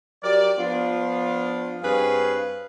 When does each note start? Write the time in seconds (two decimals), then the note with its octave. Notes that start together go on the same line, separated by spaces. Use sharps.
0.23 F#3 G4 A#4 D5
0.57 F3 B3 D4 F4
1.82 G2 C4 G#4 B4 C#5 F5